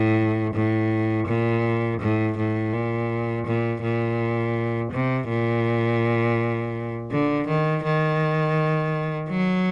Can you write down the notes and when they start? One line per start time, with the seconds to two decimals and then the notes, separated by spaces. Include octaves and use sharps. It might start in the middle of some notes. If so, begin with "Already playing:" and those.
Already playing: A2
0.54 A2
1.28 A#2
2.00 A2
2.38 A2
2.73 A#2
3.46 A#2
3.82 A#2
4.92 C3
5.29 A#2
7.11 D3
7.48 D#3
7.84 D#3
9.30 F#3